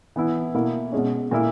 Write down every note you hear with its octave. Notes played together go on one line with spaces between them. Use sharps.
E3 B3 E4
B2 A#3 E4
B2 G#3 C#4
A#2 A#3 E4